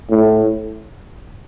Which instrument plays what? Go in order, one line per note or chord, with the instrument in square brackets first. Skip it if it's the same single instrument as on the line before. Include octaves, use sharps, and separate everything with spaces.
[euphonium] A2